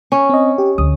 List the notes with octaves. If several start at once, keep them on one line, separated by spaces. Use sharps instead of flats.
C#4
C4 D#5
G4
D2 D#6